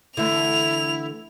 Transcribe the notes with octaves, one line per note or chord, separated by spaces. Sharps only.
D3 E3 A3 E4 F7